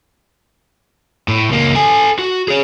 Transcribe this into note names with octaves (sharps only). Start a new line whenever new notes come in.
A2
C#2 A#3
A4 G#5
F#4
G#4 C#5